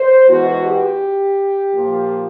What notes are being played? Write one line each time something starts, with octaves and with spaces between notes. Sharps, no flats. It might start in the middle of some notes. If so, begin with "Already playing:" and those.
Already playing: C5
E2 B2 G#3 F#4
G4
A#2 F3 A#3